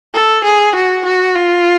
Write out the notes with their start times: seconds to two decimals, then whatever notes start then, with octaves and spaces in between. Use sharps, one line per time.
0.14 A4
0.44 G#4
0.75 F#4
1.05 F#4
1.35 F4